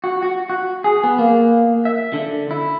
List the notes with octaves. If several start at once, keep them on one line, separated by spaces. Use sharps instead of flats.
F#4
F#4
F#4
G#4
B3
A#3
E5
D3
E4